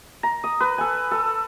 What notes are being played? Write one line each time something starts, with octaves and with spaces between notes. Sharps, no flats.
A#5
D#6
B4
A4 G#5
A4